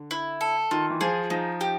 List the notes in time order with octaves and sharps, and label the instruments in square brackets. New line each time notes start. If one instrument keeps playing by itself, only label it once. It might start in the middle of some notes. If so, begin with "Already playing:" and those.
Already playing: [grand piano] D3
[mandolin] E4
A4
[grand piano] D#3 [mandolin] F4
[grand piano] E3
[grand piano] F3 [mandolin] G#4
[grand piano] F3 [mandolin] D#4
[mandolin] G4